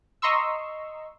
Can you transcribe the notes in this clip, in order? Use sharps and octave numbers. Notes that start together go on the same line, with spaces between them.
D#5 A#5 C6 C#6 E6